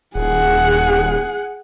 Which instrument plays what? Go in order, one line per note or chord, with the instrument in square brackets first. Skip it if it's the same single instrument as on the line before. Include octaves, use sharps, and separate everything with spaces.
[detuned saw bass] D#1 [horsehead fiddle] G#4 F#5